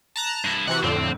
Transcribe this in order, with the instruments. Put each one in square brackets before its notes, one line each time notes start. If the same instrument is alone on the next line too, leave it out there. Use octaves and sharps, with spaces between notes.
[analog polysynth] A5 A#5 F#6
[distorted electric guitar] G2 E4
[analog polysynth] C3 E3 F#4 [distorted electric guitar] F#5
[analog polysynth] F2 A2 D3 [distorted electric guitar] C4